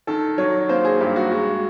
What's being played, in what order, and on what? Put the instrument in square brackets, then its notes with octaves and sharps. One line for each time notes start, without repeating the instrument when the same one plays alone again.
[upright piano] D#3 A4
F#3 C#5
A#3 C5
G#4
G2 G4
F#4
G#3 F#4